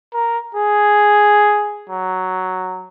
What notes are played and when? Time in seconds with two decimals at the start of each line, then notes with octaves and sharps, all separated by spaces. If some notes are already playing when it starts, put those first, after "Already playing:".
0.14 A#4
0.55 G#4
1.90 F#3